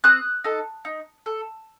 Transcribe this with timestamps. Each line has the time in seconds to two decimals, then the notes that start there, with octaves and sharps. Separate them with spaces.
0.04 C4 D#6 F#6
0.44 D#4 A4
0.85 D#4
1.26 A4